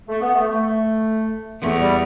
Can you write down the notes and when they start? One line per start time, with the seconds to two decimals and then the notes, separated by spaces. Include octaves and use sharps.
0.08 A3
0.21 B3
0.34 A3
0.47 A3
1.62 E2 A3
1.79 G3